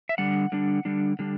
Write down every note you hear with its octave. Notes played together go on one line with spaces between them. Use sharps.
E5
D3 G3 D4 F#5
D3 G3 D4
D3 G3 D4
D3 G3 D4